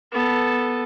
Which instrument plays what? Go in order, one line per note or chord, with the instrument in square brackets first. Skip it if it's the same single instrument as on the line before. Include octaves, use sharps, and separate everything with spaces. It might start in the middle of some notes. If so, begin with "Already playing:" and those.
[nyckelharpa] B3 A4